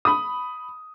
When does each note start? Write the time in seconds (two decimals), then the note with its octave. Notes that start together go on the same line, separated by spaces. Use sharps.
0.05 B5 D#6